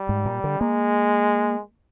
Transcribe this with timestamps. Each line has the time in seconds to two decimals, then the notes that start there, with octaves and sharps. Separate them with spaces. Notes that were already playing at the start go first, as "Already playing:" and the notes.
Already playing: G3
0.09 G#2
0.25 A#2
0.44 D3
0.60 G#3 A#3